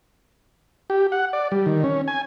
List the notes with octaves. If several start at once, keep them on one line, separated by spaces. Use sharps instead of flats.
G4
F#5
D5
G3
D#3
C#4
G#5